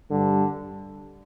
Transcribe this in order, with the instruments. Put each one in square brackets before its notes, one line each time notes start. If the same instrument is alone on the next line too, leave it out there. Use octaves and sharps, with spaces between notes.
[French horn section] G2 G3 [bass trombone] D3